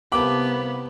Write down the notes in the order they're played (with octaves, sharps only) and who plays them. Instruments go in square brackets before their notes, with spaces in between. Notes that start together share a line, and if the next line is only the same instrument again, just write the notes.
[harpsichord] C2 A#3 B5 [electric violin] B3 [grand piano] G4 B4 A5 [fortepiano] D6